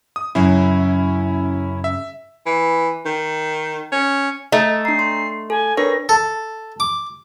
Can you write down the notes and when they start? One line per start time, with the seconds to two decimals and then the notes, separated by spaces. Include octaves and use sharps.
0.16 D#6
0.35 F#2 C#3 C#4 E4
1.84 E5
2.46 E3
3.05 D#3
3.92 C#4
4.52 A3 D#4
4.85 D4 A#5 C7
4.99 C6
5.50 A4 G#5
5.77 D4 A#4 B4 C#5 A#6
6.09 A4
6.80 D6